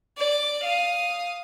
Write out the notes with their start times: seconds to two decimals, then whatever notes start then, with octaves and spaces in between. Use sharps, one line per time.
0.18 D5
0.64 F5 D#6